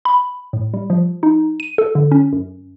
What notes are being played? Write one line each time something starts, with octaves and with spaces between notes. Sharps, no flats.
B5
A2
G3
F3
D#4
D#7
A4
D3
C#4
F#2